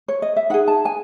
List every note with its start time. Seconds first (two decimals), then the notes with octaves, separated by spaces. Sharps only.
0.08 C#5
0.22 D#5
0.36 E5
0.50 D#4 G#4 F#5
0.68 A5
0.85 G#5